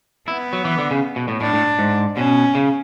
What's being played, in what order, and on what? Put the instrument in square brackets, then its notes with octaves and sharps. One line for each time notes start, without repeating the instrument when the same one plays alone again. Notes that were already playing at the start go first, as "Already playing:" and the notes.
[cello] B3 [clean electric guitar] E4
[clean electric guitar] F#3
E3
D3
C#3
B2
A2
[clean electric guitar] A2 [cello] D4
[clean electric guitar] A2
G#2
[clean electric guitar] B2 [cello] C#4
[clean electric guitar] C#3